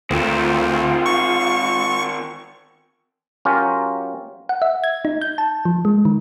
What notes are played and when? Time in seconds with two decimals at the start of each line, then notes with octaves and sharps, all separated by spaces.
0.11 D2 D#3 C4 F4
1.06 C#6
3.45 F#3 C#4 F4 G4 A#4
4.49 F#5
4.62 E5
4.84 G#6
5.05 D#4
5.21 G6
5.38 A5
5.65 F3
5.85 G#3
6.05 D#3